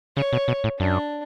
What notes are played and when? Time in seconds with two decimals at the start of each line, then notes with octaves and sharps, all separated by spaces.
0.17 C#3 C#5
0.33 B2
0.48 B2
0.64 A2
0.79 F#2 D4